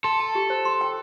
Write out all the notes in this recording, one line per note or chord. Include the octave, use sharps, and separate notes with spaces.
A4 C6
A5
G4
C5
C6
G5